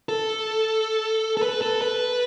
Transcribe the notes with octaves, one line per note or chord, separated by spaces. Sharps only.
A4
A4
B4
A4
B4